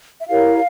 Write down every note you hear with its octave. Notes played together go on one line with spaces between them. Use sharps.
E5
E4 G4 A#4 C#5 F5